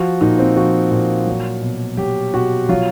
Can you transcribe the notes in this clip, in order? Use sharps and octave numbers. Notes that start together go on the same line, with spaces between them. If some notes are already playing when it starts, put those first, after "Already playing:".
Already playing: F3 F#4
A#2 D#4
C4
F3 F#4
A#2
F#3
B2
F#3 G4
B2 F#4
F#3 F4